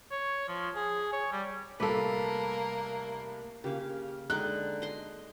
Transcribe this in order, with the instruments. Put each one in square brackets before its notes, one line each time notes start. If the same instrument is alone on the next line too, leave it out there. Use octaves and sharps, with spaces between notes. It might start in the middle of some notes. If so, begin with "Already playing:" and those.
[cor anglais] C#5
F3
G#4
C#5
G3
[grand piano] C2 A3 D6 [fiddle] A#3 [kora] A4 B4
[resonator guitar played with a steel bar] C#3 A#3 [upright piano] G4
[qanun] D3 D#4 G5 [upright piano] G#3 [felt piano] F#6
[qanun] D#5 C6